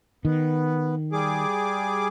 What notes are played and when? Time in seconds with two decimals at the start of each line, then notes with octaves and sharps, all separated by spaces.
0.25 D#3 B3
1.12 G3 G#4 D6